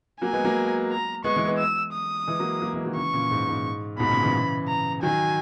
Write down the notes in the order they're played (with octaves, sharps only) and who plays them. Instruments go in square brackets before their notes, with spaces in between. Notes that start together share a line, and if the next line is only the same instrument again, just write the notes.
[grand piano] F#3 A#3 [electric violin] G#5
[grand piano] G#3 B3
F#3 A#3
[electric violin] A#5
[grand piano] G#3 B3 [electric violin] C#6
[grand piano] E3 G#3
G#3 B3
[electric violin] E6
D#6
[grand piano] E3 G#3
F#3 A#3
F#3 A#3
E3 G#3
D#3 F#3
[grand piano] C#3 E3 [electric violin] C#6
[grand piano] A#2 C#3
G#2
G#2
A#2
[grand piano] G#2 B2 [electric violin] B5
[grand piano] A#2 C#3
C#3 E3
[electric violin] A#5
[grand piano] D#3 F#3 [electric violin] G#5